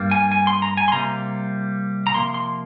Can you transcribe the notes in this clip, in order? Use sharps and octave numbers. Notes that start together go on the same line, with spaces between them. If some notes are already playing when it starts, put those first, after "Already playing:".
Already playing: G2 G3 A#3
G#5
G#5
C6
A#5
G#5
C6
C3 G3 A#3 F4 A#5
A#5
C3 F3 A#3 C6
C6